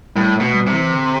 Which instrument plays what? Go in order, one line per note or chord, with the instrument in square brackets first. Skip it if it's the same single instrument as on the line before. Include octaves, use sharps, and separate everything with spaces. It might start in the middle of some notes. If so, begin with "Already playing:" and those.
[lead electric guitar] A2 [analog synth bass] G3
[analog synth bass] A3
[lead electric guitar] B2
[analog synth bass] G3
[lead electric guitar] C3
[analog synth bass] E3
D3